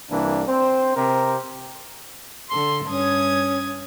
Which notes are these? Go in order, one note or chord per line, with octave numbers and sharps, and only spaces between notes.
C2 E3 A#3 D4
C4 C5
C3 G4 A#4 C5
D3 A4 C6
G2 C#4 D#6 G#6